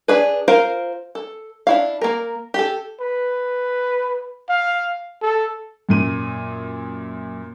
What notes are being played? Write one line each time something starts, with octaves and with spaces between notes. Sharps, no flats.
D4 G#4 B4
F4 A#4 C5 F5
A4
D4 E4 F5
A#3 A#4
G4 A4
B4
F5
A4
F#2 A#2 D#7